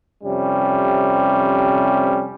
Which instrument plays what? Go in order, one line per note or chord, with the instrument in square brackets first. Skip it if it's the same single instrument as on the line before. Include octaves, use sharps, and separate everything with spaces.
[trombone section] F2 C3 G3 C#4